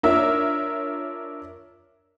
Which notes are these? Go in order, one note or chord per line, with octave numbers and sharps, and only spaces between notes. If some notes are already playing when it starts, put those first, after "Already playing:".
D4 F4 A#4 C#5 E5